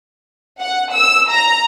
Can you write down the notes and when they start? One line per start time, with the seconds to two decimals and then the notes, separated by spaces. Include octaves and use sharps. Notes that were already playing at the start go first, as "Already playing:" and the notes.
0.59 F#5
0.94 E6
1.30 A#5